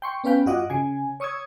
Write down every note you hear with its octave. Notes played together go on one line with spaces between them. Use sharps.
G5 C6 C#6
B3 C#4 B4 F5 G5 B5
G2 F4 F#4 D#5 F#5 D6
C#3 G#5
C#5 C#6 D#6 E6 G#6